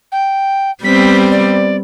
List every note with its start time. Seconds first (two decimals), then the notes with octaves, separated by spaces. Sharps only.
0.12 G5
0.84 G3 B3 C4 B6
1.31 D5